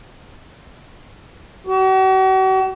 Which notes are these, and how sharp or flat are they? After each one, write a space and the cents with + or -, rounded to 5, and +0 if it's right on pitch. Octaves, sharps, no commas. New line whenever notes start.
F#4 +45